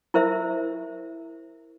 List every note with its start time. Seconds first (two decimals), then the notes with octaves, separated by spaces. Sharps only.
0.14 E4 A#4 C5 E5